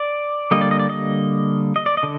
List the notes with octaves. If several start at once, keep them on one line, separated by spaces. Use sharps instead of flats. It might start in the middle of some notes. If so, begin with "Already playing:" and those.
Already playing: D5
D3 G3 A#3 D#5
D5
D#5
D5
D#5
D#5
D5
D#5
D3